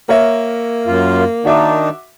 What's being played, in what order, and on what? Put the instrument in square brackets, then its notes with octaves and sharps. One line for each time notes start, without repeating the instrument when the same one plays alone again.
[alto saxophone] A#3 [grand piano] A#4 C#5 E5
[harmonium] F#2 F4
[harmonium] D#3 D4 D#4 [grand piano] F#4 E5 D6